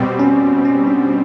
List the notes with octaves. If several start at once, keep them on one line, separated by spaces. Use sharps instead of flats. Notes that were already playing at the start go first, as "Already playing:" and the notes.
Already playing: B2 G3 C4
C#4
C#4
D4